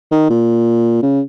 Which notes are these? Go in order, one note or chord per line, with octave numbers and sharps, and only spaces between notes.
D#3
A#2
C#3